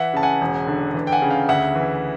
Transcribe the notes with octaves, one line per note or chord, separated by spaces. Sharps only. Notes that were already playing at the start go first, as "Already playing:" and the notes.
Already playing: E3 E5 F#5
C#3 A5
F#5 G#5
E1
D3
E3
G5
F#5 G#5
C#3
F5 G5
D2 E5 F#5
E3